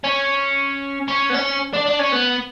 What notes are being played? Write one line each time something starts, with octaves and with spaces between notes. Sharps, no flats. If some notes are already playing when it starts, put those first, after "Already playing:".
C#4
C#4
B3
C#4
D4
D4
C#4
B3